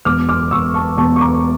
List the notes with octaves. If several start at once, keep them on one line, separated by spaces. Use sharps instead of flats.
E1 D6 F6
D6 F6
E1 C#6 E6
A5 C#6
E1 A5 C#6
C#6
A#5 D6